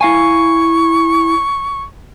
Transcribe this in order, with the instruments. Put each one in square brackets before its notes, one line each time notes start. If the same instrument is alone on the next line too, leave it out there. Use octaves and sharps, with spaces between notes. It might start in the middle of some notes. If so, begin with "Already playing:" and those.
[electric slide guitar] E4 F5 G#5 [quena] C#6